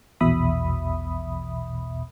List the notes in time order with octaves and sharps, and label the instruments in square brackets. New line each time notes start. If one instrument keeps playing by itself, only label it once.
[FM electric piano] A#1 E2 B2 E5 B5 D#6